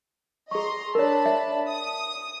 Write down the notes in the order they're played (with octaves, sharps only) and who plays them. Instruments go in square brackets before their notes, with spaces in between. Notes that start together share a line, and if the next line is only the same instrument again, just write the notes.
[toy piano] G#4 C#6 [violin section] D#5 A#5 C6
[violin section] D4 A5 B5 [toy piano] A#4 C#5
[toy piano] E5
[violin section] D#6